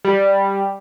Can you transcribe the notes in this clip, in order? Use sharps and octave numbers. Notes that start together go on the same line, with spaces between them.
G3